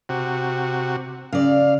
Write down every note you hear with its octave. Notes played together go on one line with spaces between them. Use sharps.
C3 F#4
C#3 D5 F5